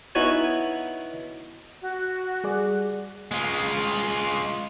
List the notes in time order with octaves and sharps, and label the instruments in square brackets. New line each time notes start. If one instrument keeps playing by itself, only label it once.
[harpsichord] B3 D#4 E4 F#4 C#5 G#5
[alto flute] F#4
[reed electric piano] G3 G#4 D5
[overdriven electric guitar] G#3 F4